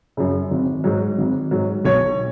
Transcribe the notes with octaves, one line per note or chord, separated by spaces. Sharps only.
F#2 C#3
G#1
G#2 F#3
G#1
G#2 F#3
B1 C#5